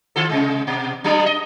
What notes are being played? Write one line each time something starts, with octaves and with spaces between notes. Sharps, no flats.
D#3 F4 A4
C3 G#3
B2
F#3 G#3 D4
D#5